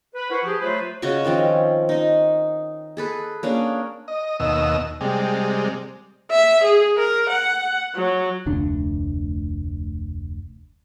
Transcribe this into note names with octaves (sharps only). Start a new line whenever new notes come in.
B4
E4 A#4 C5 F#5 C#6
F3 G4 G#4
F#3 A3 F4 B4 C5
C#3 F#4 D#5 C#6
D#3 F3 C4 C#4
D#4 D#5
G#4 A4 B4
A#3 C#4 D4 G#4
D#5
D#2 B2 D#5 E6
C3 G3 G#3
E5
G#4
A#4
F#5
F#3
F1 D2 D4